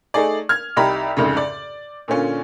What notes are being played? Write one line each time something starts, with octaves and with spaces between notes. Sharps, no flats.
A3 D#4 G#4 D5
F6 G#6
C2 D#4 G4 A#5 B5
C2 F2 G#2 C#3
D5
A#2 D3 C#4 F4